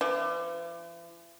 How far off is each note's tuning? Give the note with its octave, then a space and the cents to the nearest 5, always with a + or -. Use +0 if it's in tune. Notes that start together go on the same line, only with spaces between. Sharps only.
E3 +45